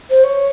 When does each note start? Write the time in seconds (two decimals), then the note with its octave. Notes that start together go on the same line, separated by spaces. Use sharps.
0.10 C5
0.24 C#5